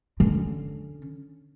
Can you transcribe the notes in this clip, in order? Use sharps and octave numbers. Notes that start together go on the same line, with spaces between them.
D3 C#4